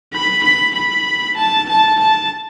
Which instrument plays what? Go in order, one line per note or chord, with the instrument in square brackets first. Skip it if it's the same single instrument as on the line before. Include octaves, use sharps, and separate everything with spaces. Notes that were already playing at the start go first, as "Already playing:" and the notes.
[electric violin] B5
B5
B5
A5
A5
A5